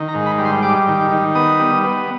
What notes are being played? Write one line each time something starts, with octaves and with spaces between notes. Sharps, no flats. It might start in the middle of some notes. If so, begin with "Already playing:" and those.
Already playing: D#3
A#5
G#2
B5
G3
C6
G3 D6
D#3
D#3
B3 D#6
G3
B3